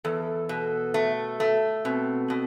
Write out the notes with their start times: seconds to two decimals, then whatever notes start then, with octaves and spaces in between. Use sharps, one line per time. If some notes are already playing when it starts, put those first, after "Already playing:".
0.04 E2 A4
0.49 B2
0.94 A3
1.40 A3
1.85 B2 C4
2.30 B2